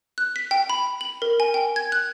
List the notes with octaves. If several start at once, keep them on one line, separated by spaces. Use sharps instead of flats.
F#6
B6
G5
B5
F#7
A#4
G#5
G5
G#6
F#6